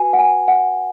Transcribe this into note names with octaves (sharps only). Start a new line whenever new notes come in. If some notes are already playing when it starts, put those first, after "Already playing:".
Already playing: F#4 B4 G#5
F#5
G#5
F#5